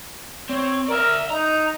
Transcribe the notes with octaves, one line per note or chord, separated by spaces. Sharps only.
C4 C#5
A#4 D5 E5
D#4 A#5